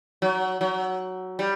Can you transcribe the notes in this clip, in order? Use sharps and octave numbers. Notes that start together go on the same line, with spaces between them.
F#3
F#3
G3